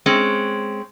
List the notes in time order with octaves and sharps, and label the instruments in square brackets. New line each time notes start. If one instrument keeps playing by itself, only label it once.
[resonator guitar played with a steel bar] G#3 C4 C#4